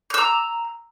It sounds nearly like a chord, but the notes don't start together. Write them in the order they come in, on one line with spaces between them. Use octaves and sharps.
F6 E6 A#5